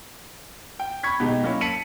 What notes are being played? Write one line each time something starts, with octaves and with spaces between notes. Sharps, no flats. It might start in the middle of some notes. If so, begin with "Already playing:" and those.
G5
B5 C#6 G#6 B6
B2 G#3 D#4 G4
F#3 A#3 C#4 E4
A5 B6 C#7 D#7 F#7